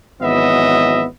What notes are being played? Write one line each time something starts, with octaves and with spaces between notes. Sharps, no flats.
G#1 E3 F#3 B3 D#5 E5